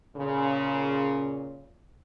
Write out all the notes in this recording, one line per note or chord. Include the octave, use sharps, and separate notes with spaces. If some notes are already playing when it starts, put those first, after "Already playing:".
A#2 C#3